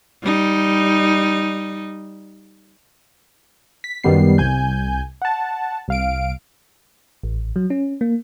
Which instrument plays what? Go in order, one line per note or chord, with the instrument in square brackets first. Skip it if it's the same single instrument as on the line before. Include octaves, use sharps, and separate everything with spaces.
[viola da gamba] G3 D#4
[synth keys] B6
F#2 D#3 G3 B3 C7
C2 G#5 G6
F#5 A5
C2 F5 D7
[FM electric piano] A1
F#3
C#4
A#3